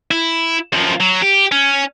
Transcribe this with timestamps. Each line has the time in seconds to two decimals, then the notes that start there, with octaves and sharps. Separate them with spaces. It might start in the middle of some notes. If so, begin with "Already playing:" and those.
0.11 E4
0.73 F#2 F3
1.00 F#3
1.22 G4
1.52 C#4